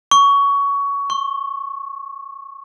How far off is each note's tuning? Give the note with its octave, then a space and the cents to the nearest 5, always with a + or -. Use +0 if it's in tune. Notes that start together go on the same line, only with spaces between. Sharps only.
C#6 +20
C#6 -30